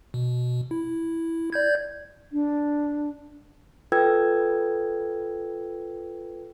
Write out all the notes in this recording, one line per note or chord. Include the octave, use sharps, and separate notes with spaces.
B2
E4
D5 G6 G#6
D4
F4 A4 B4 G5 E6 G#6